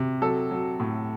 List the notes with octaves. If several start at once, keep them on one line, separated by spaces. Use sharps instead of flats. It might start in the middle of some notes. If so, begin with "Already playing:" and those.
Already playing: C3
F#3 A4
F#3
A2